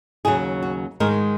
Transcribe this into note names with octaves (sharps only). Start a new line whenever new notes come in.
D#2 C#3 F#3 G#4
F#4
G#2 D#3 G#3 A#4